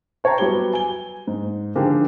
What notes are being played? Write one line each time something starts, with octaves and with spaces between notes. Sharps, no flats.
C5 C#5 G5 A5 A#5
F#3 G3 B3 G4 G7
G#5 G7
G#2
D3 D#3 F3 G4 G#4 A#4